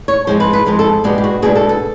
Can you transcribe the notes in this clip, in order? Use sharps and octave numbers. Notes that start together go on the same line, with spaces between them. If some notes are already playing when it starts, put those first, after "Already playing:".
C#5
F3 G#3 C4 C5
B4
B4
F3 G#3 C4 A#4
A4
B2 G#3 B3 D4 G4
G4
F#4
B2 G#3 B3 D4 G#4
A4
A4